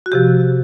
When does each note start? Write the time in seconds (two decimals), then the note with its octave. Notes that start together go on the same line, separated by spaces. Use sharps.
0.06 F#4
0.12 C3 F3 G4